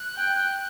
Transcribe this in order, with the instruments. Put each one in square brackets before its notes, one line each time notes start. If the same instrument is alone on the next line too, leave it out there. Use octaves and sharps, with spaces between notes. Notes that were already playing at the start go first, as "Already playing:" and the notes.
Already playing: [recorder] F#6
[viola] G5